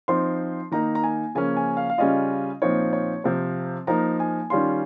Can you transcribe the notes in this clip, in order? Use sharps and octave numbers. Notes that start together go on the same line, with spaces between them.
F3 C4 D#4 C6
D#3 A#3 D#4 A#5
A#5
G#5
C#3 F3 A#3 C#4 G#5
G#5
F5
F5
C#3 G3 C#4 F4 D#5
A#2 F3 C4 D#4 C#5
C#5
C3 F3 C4 C5
F3 A#3 D#4 A#5
G#5
D#3 G3 C#4 F4 C6